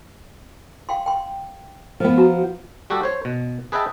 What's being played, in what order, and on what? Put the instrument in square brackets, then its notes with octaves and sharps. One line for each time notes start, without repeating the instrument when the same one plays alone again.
[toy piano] F5 G5 C6
G5 C6
[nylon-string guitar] F3 B3
[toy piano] F#4 A#5
[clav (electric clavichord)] G3 F#4 G4 A4
C5 C#5
B2
G#4 B4 D#5 E5 G5 A5